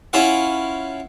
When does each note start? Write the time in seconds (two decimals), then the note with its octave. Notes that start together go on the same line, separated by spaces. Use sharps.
0.13 C#4 E4 F4 E5 F#5